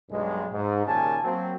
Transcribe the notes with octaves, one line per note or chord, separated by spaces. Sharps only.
B1 G2 G#3
G#2
D#2 A#2 C#3 C#4 G#5 A5
F#3 A#3 C4